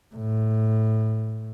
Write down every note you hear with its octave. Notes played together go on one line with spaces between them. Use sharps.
A2